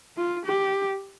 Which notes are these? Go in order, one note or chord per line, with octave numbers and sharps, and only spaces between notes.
F4
G4